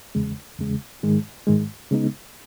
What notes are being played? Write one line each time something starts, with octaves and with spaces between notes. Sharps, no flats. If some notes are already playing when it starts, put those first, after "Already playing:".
E2 C#3 G#3
E2 C#3 G#3
G#2 D#3 G#3
G#2 D#3 G#3
C#3 G#3 B3 D#4